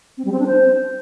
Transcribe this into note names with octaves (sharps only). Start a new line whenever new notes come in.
C4
G3
C4
D4
C5